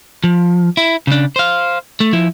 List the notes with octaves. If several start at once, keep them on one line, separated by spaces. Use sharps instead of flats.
F3
E4
C#3 D4
C5 F5
A3
F3 E4